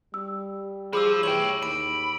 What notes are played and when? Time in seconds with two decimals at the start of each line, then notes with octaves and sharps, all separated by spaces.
0.14 G3 E6
0.93 F4 G#4 C5 B5 D6 E6
1.23 E3 C#5 G5 F#7
1.63 D#2 B5 D7